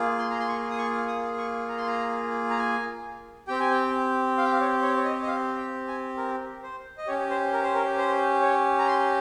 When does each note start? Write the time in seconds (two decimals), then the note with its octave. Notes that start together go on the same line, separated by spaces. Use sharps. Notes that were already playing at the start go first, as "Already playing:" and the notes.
Already playing: A#3 F4 G#4
0.18 C6
0.30 A#5
0.40 C6
0.48 C#6
0.70 D#6
0.78 C#6
1.07 D#6
1.38 C#6
1.68 A#5
1.77 C6
1.87 A#5
2.50 A#5
2.58 G#5
3.48 C4 G4 G5
3.60 G#5
3.71 G5
4.38 F5
4.44 G5
4.52 F5
4.61 C#5
4.82 C#5
4.97 C#5
5.05 D#5
5.22 D#5
5.27 F5
5.57 G5
5.88 G#5
6.17 A#4
6.63 C5
6.98 D#5
7.07 C#4 G4 C#5
7.30 C5
7.53 A#4
7.63 C5
7.75 A#4
7.98 C5
8.42 C#5
8.79 A#5
8.88 C6